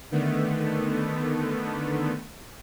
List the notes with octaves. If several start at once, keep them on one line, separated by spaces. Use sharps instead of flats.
D3 D#3 A3 B3